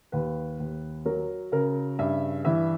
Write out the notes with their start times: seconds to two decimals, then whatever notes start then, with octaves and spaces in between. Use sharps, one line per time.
0.12 D#2 B4
0.60 D#2
1.05 F#3 A#4
1.52 C#3 A#4
1.99 G2 E5
2.45 E3 E5